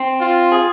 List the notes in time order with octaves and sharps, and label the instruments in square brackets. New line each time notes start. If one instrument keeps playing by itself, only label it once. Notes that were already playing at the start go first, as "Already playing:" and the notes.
Already playing: [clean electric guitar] C4
[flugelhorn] F4
[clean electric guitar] G#4